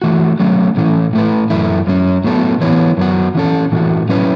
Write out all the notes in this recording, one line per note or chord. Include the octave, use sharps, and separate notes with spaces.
E3 A3 F#4
F#3 A3 C#4
A2 E3 A3 C#4
A2 A3 E4 B4
F#2 E3 A3 E4
F#2 F#3 C#4
A2 F#3 B3 A4
E3 B3 E4 C#5
F#2 F#3 B3 F#4
E3 C#4 A4
A2 E3 A3 F#4
F#3 C#4 E4 B4